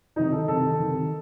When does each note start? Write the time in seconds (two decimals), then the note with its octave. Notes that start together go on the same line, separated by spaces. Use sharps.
0.16 C3 D#3 D#4
0.32 A4
0.48 C3 D#3 A4
0.80 D#3
0.85 C3